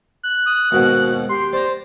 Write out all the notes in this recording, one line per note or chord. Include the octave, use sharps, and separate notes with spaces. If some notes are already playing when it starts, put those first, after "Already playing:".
F#6
D#6
D#2 G#2 B2 F#4
G4 C6
C5 D5 A#5